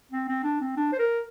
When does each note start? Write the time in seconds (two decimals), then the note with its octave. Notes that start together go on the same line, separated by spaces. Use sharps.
0.11 C4
0.28 C4
0.43 D4
0.60 C4
0.77 D4
0.93 C5
0.99 A#4